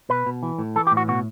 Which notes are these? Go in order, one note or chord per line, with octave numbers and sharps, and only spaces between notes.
B2 B4
B2
E3
A2
E3 A4
G4
A2
F#4
B2 F#4